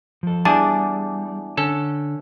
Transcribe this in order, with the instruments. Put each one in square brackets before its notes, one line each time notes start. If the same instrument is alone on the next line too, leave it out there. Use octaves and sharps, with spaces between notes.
[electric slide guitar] F3 A4
[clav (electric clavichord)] E2 D4 G#4 [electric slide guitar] G3 [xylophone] G#5 [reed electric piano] A5 D6
[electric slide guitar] D3 [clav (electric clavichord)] C#4 A4